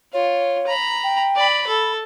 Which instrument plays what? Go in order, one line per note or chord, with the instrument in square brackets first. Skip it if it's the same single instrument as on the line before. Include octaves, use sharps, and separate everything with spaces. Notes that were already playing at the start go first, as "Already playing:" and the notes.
[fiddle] F4 [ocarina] C#5
[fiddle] A#5 B5
[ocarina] G5
[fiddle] D5 B5
[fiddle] A4 [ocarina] B5